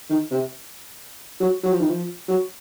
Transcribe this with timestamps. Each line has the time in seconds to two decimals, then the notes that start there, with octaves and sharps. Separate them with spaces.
0.10 D#3
0.31 C3
1.40 F#3
1.63 F#3
1.71 F3
1.80 D#3
1.89 F3
2.28 F#3